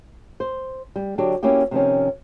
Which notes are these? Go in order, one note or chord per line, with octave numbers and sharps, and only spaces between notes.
C5
G3
D3 F#3 D4 G4
A#3 C#4 E4 F#4 G4
C3 D#3 F3 C#4